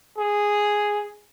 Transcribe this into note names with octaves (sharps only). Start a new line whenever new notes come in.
G#4